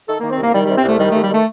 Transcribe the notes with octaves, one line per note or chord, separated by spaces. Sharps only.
D#3 A4
D#3 A#3
C4
C2 A#3
D#3 G3
G3
C3
C4
C2 A3
D#3 G3
D#2 A3
G3
D#3 A3